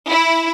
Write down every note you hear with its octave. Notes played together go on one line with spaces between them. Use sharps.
E4